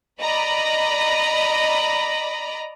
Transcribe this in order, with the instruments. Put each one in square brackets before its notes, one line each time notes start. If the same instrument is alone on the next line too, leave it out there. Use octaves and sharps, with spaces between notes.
[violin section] D5 D#5 A#5 B5